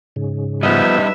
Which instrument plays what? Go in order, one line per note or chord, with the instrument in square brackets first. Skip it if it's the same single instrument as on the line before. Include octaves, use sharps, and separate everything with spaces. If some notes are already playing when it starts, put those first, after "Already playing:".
[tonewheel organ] G#2 C#3
[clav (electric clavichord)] F3 B3 D#5 [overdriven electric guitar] G3 D#4 [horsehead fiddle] B4 E5